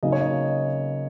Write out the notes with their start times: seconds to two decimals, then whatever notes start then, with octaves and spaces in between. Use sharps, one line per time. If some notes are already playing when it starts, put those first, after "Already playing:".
0.03 C#3 F#3 A#3 D#4 D#5
0.12 C#5
0.21 D#5